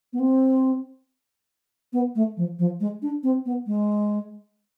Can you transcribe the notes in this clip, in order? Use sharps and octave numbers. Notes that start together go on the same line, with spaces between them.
B3
C4
B3
A3
F3
F3
G#3
D4
C4
B3
G#3